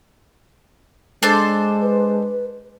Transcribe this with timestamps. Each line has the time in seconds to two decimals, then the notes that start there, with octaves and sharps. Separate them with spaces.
1.23 G#3 D4 A4 C5
1.81 B4